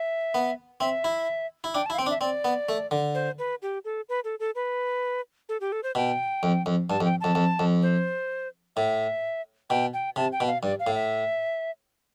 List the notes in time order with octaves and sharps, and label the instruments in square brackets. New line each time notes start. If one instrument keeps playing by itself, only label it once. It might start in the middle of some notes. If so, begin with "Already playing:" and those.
Already playing: [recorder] E5
[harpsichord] B3
[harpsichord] C4 [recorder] E5
[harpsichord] E4
E4
[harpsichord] D4 [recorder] G5
[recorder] A5
[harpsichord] E4
[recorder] F5
[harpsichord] C4 [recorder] G5
[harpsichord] D4
[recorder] E5
[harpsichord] C4 [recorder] D5
[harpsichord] B3
A3
D3
[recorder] C5
B4
G4
A4
B4
A4
A4
B4
A4
G4
A4
C5
[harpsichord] B2 [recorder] G5
[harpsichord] F2
F2
[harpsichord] G2 [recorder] A5
[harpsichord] F2
[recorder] G5
[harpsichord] F2 [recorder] A5
[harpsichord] F2
F2
[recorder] C5
[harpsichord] A2 [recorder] E5
[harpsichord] B2 [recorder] G5
[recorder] G5
[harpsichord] C3 [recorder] A5
[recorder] G5
[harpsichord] B2
[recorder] F5
[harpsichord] G2 [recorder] D5
[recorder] F5
[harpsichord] A2
[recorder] E5